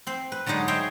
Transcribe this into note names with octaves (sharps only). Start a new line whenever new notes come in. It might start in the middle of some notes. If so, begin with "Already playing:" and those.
C4 C5
B4
D3 F#3 G#3 D#4 G#4
G#4 C5 C#5 D#5 E5 G5